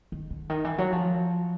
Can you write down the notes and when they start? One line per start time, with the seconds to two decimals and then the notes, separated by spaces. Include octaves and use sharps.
0.12 D#3
0.30 D3
0.50 D#3
0.64 E3
0.78 F#3
0.93 F3